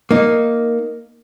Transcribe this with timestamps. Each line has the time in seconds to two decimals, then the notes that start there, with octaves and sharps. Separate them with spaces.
0.11 A#3 D#4